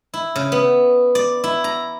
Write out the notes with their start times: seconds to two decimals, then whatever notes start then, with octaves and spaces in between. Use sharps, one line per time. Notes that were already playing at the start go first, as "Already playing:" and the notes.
0.14 E4
0.36 C#3
0.52 B3
1.15 D5
1.44 E4
1.64 A#5